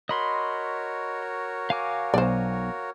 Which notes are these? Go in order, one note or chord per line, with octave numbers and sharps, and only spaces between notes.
F#4 A#4 C#5 D#5 B5 C6
F5 G#5 D6
B1 C5 D5